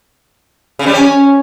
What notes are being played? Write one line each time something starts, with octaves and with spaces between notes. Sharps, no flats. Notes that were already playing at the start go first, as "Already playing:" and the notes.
C#3
G3
C#4